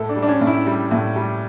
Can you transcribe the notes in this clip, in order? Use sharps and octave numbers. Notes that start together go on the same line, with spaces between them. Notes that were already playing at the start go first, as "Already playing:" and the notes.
Already playing: A2 A4
D4
G3
D4
C#4
A2
E4
G3
A2
G3